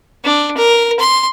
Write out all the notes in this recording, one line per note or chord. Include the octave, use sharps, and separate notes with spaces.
D4
A#4
C6